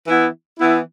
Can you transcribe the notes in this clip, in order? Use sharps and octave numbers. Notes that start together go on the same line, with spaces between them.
E3 B3 E4
E3 B3 E4